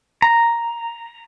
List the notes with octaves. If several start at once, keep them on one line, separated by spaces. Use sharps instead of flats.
A#5